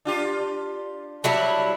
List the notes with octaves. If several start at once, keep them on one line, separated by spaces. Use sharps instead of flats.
D4 F4 G4
F#3 G3 E4 A5